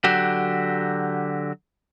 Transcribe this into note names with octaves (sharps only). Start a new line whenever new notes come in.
D3 F#3 F#4 G4